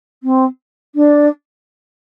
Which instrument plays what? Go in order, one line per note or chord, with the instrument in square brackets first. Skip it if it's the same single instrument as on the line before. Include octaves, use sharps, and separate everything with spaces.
[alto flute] C4
D4